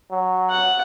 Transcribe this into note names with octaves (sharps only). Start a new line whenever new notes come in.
F#3
F#5